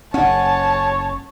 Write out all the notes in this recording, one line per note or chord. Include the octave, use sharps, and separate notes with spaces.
F#1 C#4 C#5 F#5 G#5 A5